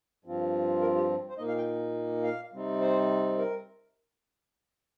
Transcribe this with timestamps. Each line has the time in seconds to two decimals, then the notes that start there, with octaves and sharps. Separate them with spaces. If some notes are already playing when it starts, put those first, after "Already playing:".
0.24 G2 F3 C4 F4
0.81 A#4
0.95 G4
1.10 F4
1.29 C5
1.38 A#2 A#3 D#4 D#5
1.48 F5
1.57 G5
2.23 F5
2.52 C3 G3 C4 D#4
2.81 C5
3.38 A#4